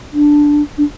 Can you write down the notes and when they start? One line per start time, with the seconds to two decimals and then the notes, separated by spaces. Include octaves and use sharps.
0.13 D4
0.78 D4